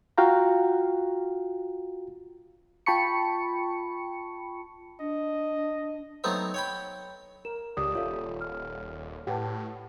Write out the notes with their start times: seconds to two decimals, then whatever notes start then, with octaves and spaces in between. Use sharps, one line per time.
0.18 F4 F#4 F5 G5 A#5
2.86 F4 G5 A5 B5 C#6 C#7
5.00 D4 D#5
6.24 F#3 A3 B3 C4 D#4
6.54 C#5 G5 B5
7.45 A#4 E7
7.77 C#2 G4 D5 D#6
7.95 D#1 F4 A4 C#5 E5
8.41 F6
9.27 A2 G4 B4 F#5 A5